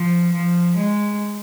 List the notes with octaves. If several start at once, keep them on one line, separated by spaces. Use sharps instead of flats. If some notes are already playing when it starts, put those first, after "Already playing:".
Already playing: F3
F3
G#3